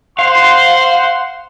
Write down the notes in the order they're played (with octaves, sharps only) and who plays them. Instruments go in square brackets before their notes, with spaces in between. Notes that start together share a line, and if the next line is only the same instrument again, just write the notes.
[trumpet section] C5 F#5 C6 [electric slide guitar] F5